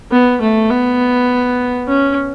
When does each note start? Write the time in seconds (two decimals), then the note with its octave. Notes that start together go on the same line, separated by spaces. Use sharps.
0.11 B3
0.41 A3
0.70 B3
1.88 C#4